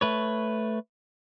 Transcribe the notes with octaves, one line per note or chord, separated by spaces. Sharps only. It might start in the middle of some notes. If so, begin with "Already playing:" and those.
A3 B4 C#5